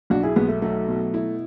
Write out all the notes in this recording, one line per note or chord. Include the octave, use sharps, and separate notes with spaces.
B1 D4 F#4
E4 G#4
B1 G#3 B3
A3
F#3 A3
B2
E4